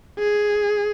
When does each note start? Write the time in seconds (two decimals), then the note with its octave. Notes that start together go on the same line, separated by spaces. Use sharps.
0.19 G#4